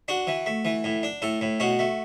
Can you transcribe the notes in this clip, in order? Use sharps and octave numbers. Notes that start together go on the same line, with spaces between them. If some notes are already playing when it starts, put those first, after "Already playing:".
D4 F#4
E3
A3
E3
A2
D4
A2 A4
A2
B2 F#4
A3